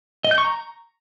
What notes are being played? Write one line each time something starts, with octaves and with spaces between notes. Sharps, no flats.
D#5
G6
C#6
A#5